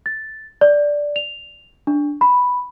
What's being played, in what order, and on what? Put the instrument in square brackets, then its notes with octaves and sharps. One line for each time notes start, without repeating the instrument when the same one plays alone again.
[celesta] A6
D5
F7
D4
B5